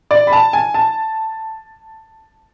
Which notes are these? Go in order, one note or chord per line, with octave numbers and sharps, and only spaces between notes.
D5
B5
A5
G#5
A5